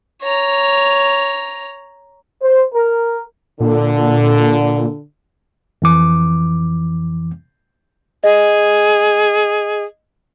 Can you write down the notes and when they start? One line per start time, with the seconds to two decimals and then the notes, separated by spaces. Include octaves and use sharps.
0.23 C#5 A#5
2.43 C5
2.74 A#4
3.60 A#2 D3
5.82 F2 E3 D6
8.24 G#4 D#5